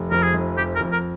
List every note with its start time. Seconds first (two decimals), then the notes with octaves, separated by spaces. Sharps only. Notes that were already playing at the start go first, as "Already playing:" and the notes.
Already playing: F1
0.11 F2 A#4
0.23 G#4
0.34 F1
0.57 F2 G4
0.75 A#4
0.81 F2
0.92 A#4